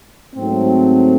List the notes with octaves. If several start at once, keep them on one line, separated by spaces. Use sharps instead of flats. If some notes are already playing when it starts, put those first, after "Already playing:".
G#2 F#3 A3 C4